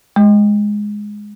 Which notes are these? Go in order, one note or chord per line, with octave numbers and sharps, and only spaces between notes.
G#3